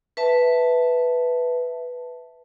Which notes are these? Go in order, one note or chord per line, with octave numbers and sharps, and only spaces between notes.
B4 E5 A5